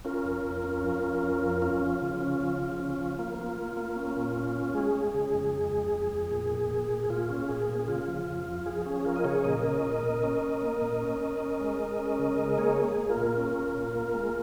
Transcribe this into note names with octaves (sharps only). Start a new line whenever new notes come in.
C#4 F4 A#4
F2
F2
C#4
F3
C#4
F2
F3
C#4 F4
F3
C#3
C#4
F3
C#3
C#4
F3
A#3 F4
A#3 F4
A#3
A#3
C#4
A#2
C#4
C#4
G#3 G#4
G#3
C#3
F2
G#3
F2
F2
F2
A#2
A#2
A#2
A#2
G#4
A#2 F4
C#4
A#2 G#4
A#2
G#4
C#3 F4
F3
F2
F3
F3 G#4
C#4 G#4
F3 F4 A#4
D#5
C#3 G#4 C#5
A#2 A#4 D#5
C#4
A#2
A#2
C#4
C#4
A#3
A#2
C#4
C#4
C#4
G#3
G#3
C#4
C#3
G#3
A#3 G#4 C#5
A#3
G#4
A#3
F4 A#4
A#2
C#4
C#4
A#2
A#3
G#3